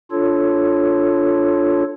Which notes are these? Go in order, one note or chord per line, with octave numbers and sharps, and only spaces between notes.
D4 F4 A4 C#5